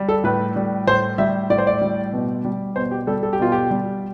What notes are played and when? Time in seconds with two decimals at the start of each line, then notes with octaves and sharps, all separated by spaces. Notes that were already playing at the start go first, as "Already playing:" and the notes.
Already playing: G3
0.09 A4
0.24 A2 B4
0.56 G3
0.87 A2 C5
1.18 G3 E5
1.50 A2 D5
1.58 C5
1.67 D5
1.82 G3
2.13 B2
2.45 G3
2.76 B2 C5
2.91 G4
3.07 G3 A4
3.23 A4
3.33 G4
3.40 B2 F4
3.52 G4
3.71 G3